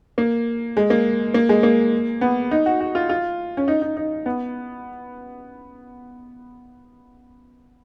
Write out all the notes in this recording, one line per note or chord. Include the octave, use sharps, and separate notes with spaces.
A#3
G#3
A#3
A#3
G#3
A#3
B3
D#4
F#4
F#4
F4
F4
C#4
D#4
D#4
D#4
B3